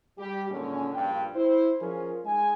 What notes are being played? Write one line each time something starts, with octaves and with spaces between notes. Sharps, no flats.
G3 G4
A#2 D3 D#3 G#3 C#4
A#1 G2 F4 D5 G5
E4 C5
F3 C#4 F4 G#4 A#4
G#3 D#4 G#5